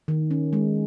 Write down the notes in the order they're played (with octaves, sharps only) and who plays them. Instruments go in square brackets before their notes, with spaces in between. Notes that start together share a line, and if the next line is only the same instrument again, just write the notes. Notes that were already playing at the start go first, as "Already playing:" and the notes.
[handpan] D#3
C#4
G#3